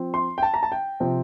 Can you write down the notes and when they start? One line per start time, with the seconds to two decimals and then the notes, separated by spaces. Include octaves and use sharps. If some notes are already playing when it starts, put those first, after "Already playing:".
Already playing: F3 C4
0.14 C6
0.38 G5
0.43 A5
0.54 A#5
0.63 A5
0.72 G5
1.00 C3 F3 C4